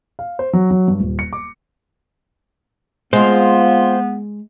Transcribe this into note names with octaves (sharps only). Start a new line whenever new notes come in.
F5
C5
F#3
F#3
G2
D#1
C#7
D6
G#3 B3 C4 F4 C5